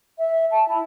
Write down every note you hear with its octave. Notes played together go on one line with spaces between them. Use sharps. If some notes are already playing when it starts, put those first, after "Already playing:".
E5
A5
E4